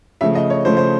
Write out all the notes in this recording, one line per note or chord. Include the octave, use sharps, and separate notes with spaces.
C#3 F3 A3 E5
D#5
C#5
C#3 F3 A3 C5
C5